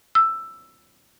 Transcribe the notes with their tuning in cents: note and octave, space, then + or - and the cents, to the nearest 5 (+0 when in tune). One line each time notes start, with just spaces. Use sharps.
E6 +10